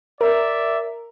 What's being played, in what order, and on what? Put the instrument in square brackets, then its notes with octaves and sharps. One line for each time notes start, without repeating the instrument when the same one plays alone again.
[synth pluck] A#4 [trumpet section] D5 E5